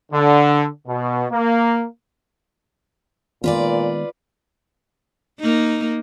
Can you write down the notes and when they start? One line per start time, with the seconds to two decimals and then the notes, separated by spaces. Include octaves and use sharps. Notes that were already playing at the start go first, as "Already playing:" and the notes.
0.13 D3
0.87 B2
1.31 A#3
3.44 A#2 D#3 G#3 B3 F4 B4 D5
5.40 A#3 D#4